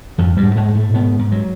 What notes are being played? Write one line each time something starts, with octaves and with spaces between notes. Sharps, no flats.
F2 G#2 F3
G2 G3
G#2
G#2 G#3
G#2
A2 A3
G#2 B2 B3
G#2
F#3